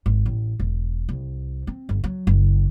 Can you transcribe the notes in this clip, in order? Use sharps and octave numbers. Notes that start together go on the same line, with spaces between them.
G#1
A1
E1
C2
C4
G1
F#3
F#1